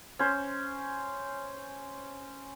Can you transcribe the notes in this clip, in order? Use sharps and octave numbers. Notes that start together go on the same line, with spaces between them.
C#4 C5